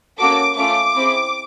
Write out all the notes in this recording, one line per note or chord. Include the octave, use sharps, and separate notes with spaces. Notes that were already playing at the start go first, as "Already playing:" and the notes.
A#3 C#4 F#4 A4 D6
A3 C#4 F4 A4 D6
C4 E4 G#4